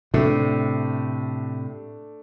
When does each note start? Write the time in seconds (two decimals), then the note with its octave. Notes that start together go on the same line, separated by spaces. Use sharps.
0.14 A2 C3 A3 D4